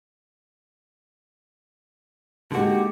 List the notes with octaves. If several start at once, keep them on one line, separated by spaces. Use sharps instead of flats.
D3 G#3 A#3 D#4 F#4 G4